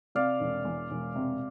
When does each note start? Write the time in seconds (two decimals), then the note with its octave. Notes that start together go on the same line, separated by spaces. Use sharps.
0.15 C3 D5 F5
0.40 E1
0.65 E2
0.91 E1
1.15 C3